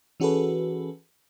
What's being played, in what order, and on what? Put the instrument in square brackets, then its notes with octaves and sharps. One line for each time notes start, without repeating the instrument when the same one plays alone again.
[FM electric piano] E3 C#4 F#4 G#4 A4 B4